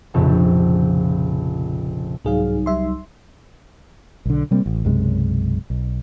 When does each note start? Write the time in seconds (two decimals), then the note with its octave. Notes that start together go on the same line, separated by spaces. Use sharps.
0.14 F1 A#1 F2 C#3 F3 C#6
2.25 C2 G#2 F#3 D#4 G#4 F5
2.66 G3 E5 C6
4.26 B1 D3
4.51 C3 G3 A#3 C4
4.66 A1
4.85 B1 F#2 C3 G#3
5.70 B1